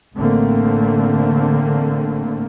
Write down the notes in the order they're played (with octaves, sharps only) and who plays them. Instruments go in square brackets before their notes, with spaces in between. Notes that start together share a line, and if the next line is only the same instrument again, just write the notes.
[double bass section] A1 D3 A3 A#3 C4